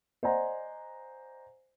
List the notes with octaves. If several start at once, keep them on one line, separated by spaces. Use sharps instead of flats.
C5 D5 D#5 F#5 G#5 A#5